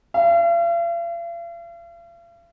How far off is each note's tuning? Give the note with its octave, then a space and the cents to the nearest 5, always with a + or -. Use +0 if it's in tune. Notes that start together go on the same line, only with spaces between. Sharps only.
F5 -45